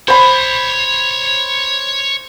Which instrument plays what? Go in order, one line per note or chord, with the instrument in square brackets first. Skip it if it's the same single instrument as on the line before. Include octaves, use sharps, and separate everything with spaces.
[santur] C5 B5 [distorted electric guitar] C#5 C6